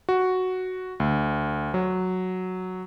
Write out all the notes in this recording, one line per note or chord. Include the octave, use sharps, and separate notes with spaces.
F#4
D2
F#3